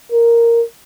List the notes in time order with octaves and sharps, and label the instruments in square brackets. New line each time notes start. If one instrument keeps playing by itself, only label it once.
[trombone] A#4